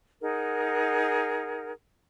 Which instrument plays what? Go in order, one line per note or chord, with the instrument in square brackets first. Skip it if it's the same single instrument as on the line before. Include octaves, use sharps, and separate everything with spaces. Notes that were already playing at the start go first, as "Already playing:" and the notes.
[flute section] D#4 G#4 A#4 F#5